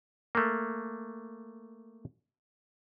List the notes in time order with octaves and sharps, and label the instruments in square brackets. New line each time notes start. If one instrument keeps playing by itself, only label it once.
[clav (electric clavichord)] A3 A#3